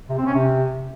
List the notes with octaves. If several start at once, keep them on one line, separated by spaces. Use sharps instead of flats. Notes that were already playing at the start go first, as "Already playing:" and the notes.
C3
C4
C#4
C3